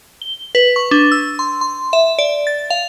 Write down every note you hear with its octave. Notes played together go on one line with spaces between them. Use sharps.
G7
B4
C#6
D4
E6
C6
C6
E5
D5
A6
F5